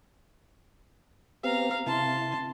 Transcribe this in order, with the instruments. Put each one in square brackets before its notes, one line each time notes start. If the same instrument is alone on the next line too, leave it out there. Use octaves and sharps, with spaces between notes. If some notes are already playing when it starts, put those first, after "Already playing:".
[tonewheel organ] B3 C4 G4 [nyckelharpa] F5 A#5
[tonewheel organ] C3 E4 [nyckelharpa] A5 C6